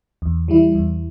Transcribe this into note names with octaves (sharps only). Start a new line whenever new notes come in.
E2
E3 G3 E4
E2